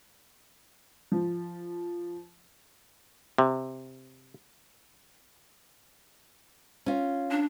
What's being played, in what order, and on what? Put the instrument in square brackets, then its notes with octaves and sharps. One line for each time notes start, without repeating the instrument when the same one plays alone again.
[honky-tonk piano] F3
[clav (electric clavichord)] C3
[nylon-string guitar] C#4 F4
[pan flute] D4